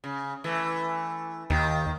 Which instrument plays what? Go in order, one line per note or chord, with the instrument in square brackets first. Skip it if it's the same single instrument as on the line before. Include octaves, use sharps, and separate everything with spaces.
[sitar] C#3
E3 A3
[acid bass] D#2 [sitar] D#3